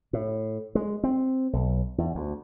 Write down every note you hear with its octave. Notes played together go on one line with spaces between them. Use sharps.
A2
G#3
C4
B1
E2
D2